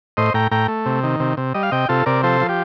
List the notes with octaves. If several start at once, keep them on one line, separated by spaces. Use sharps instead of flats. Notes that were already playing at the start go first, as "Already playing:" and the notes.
A2 C5 D#5
A2 G5 A#5
A2 G5 A#5
A3
C3
D#3
C3
C3
G3 D#5
F5
C3 D#5 G5
C3 F4 A4
C3 A#4 D5
F3 A4 C5
F3
G4